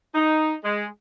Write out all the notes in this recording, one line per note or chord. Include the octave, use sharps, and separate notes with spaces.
D#4
G#3